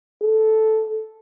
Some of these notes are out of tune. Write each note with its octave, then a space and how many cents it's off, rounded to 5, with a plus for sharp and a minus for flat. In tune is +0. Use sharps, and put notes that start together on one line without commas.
A4 -5